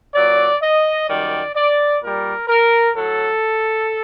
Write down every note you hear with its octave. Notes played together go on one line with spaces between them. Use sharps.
A#2 F#3 D5
D#5
F#2 D#3 G3 D5
D5
A#2 G3 A#4
A#4
A2 F#3 A4